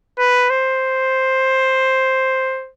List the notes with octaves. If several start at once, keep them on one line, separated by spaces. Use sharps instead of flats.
B4
C5